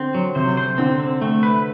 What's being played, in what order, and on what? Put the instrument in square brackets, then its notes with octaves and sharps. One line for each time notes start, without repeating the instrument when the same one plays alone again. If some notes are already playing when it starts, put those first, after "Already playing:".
Already playing: [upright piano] D3 [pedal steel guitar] C4
[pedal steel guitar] F#3
[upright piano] C3 [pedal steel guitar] C5
[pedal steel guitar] C5
[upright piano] D3 [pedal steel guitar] C4
[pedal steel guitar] C4
A3
B4